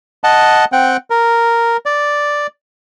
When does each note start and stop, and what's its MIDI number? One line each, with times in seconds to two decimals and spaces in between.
0.24 0.65 75
0.24 0.65 78
0.24 0.65 81
0.72 0.97 60
0.72 0.97 78
0.72 0.97 79
1.10 1.77 70
1.86 2.47 74